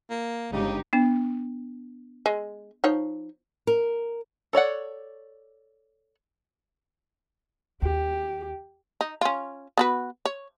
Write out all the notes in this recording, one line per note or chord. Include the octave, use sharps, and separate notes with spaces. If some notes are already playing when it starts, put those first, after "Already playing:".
A#3
G1 G2 C#3 G#3 D#4 G4
B3 D4
G#3
F3 D#4 C#5
A#4
A4 C#5 D5 F#5
D#2 G4
D#4
C#4 F4
B3 F#4 B4
C#5